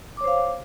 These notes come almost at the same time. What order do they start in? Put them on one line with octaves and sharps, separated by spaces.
D6 C#5 C5 F5